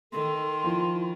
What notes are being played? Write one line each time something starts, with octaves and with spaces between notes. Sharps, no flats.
D#3 A4 C6
F3 E4